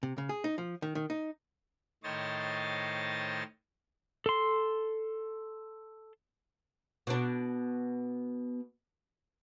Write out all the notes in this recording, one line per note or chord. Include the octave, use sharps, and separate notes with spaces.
C3
C#3
G#4
D#4
F3
D#3
D#3
D#4
A2 D#3 C5 C#5 D#5 A6
A4 C6
B2 D4